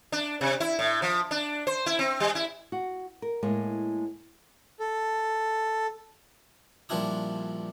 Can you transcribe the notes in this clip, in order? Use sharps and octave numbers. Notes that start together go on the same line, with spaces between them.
D4
C3
E4
A2
F3
D4
C5
E4
C4
G3
E4
F#4
A#4
A2 G#3 A#3
A4
A#1 F3 G3 D4 E4 D#6